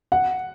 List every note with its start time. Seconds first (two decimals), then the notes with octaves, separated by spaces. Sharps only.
0.12 F#5